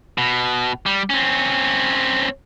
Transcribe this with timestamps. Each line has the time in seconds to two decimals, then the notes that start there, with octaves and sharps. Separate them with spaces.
0.18 B2
0.86 G3
1.10 C4 C#4